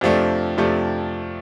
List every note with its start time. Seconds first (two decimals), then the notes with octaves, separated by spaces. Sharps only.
0.01 F2 C3 F3 A3 D4
0.58 F2 C3 F3 A3 D4